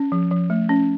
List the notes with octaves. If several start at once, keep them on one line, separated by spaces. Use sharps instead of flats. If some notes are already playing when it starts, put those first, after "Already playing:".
Already playing: C#4
F3
F3
A3
C#4